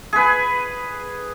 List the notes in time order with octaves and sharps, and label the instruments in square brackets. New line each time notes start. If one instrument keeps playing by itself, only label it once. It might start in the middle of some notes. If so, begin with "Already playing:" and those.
[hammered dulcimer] G#4 B4